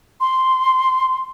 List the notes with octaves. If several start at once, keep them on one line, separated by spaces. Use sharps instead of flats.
C6